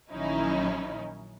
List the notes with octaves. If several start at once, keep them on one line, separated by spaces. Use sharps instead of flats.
A#1 D#3 F#3 C#4 D#4 E4